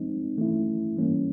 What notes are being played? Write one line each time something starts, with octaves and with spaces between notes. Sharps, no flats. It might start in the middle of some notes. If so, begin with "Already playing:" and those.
Already playing: F3 G#3 C4 D#4
E3 A3 C#4 E4
E3 G3 A#3 C#4